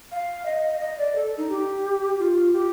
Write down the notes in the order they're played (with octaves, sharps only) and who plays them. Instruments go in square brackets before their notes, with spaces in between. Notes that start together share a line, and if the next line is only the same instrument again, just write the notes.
[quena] F5
D#5
D#5
D5
A4
D#4
G4
F4
G4